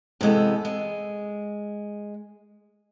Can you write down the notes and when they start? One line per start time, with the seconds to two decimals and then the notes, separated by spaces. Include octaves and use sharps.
0.21 C3 E3 G#3 B3 A4
0.65 G#3